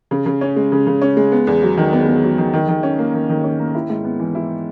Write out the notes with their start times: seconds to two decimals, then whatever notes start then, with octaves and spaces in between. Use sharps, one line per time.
0.11 C#3
0.26 C#3
0.41 C#4
0.56 G#3
0.72 C#3
0.87 C#3
1.02 C#4
1.17 G#3
1.32 B3
1.47 E2
1.63 F#3
1.77 D#3
1.93 B3
2.08 E2
2.23 F#3
2.38 D#3
2.53 D#3
2.69 D#3
2.83 C#4
2.99 A#3
3.14 D#3
3.29 D#3
3.44 C#4
3.59 A#3
3.74 E4
3.90 G#2
4.04 B3
4.19 E3
4.35 E4